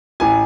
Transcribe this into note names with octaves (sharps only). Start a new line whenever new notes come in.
A1 E3 G#5